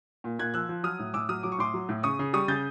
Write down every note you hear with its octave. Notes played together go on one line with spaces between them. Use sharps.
A#2
A#2 F#6 G#6
F3 E6 F#6
F3
F#3 D#6 F6
A2
A2 D6 E6
F#3 D#6 F6
F#3 D6
C#6
A2 C6 D6
F#3
A2
C#3 C#6 D#6
C#3
G3 C#6 D#6
C#3 G6 A6